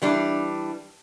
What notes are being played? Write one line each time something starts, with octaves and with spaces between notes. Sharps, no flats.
E3 G3 D4